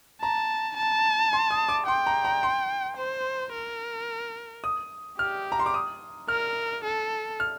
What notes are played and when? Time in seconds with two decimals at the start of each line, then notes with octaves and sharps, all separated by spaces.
0.22 A5 A#5
0.77 A5
1.33 C6
1.51 D#6
1.69 D6
1.87 G5 C6
2.07 A#5
2.25 A#5
2.43 C6
2.97 C5
3.52 A#4
4.64 D#6
5.19 G4 F6
5.52 A#5
5.59 C6
5.66 D6
5.74 D#6
6.28 A#4 F6
6.85 A4
7.40 F6